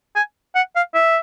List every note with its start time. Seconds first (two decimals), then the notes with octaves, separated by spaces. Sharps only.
0.16 G#5
0.55 F#5
0.76 F5
0.94 E5